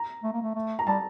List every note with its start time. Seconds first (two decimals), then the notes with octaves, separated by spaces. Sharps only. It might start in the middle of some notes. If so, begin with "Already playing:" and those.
Already playing: A#5
0.23 A3
0.33 A#3
0.43 A3
0.55 A3
0.79 A#5
0.87 G3 A5